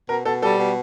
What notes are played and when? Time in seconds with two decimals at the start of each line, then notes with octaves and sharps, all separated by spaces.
0.09 B2 A#4
0.25 B2 A4
0.42 G3 A4
0.59 B2